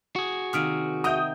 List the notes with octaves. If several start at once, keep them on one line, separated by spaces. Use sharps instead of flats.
F#4 G#4
C3 D#3 A#3 D#6 F6 D7
D#5 E5 F#5 G5 A#5 D#6 G6